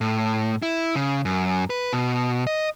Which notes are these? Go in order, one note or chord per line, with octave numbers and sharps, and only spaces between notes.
A2
E4
C#3
F#2
B4
B2
D#5